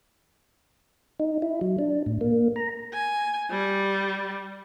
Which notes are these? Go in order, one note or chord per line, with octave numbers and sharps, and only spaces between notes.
D#4
E4
F#3
D4
A2
A#3
A#5
G#5
G3